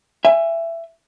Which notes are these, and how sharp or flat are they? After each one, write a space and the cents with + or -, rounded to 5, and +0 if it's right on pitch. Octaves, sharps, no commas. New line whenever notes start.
E5 +20 G#5 -20